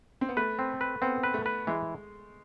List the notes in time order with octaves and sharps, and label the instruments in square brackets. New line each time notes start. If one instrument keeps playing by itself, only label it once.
[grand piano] C4
B3
[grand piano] A3 [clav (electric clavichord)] B4
[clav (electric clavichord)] C4
B4
[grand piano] B3 [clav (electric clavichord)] C4
[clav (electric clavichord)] B4
[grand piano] A3
[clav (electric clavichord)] B4
[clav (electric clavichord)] E3 [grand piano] G#3